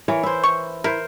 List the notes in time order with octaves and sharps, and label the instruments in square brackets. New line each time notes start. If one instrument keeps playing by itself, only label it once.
[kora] E3 A#4 C#5
E4 C5
[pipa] C#6
[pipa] E4 [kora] A#4 C5